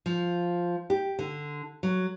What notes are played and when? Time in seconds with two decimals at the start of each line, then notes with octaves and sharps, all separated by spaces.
0.06 F3
0.90 G4
1.19 D3
1.83 F#3